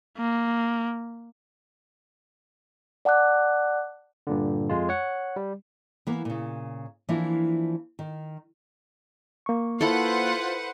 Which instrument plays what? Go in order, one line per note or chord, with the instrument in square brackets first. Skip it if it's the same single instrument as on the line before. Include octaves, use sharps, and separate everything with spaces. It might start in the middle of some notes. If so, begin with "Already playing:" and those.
[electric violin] A#3
[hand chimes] D5 F#5 A5 D6 F#6
[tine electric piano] G2 A#2 D3
F2 G#3 F4
C#5 F#5
G3
[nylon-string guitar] E3 A#3 B3
A#2 C#3
E3 F3 A#3 D4 E4 F4
D#3
[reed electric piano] A#3 C#6
[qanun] E4 A4 [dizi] F4 [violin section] B4 C5 F#5